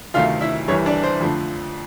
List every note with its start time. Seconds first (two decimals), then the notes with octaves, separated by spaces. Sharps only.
0.14 D2 C3 D#3 F#3 A3 F4 F5
0.41 E4 E5
0.68 C2 C3 E3 G3 C#5
0.86 D4 D5
1.03 C5
1.21 F2 D3 F3 A3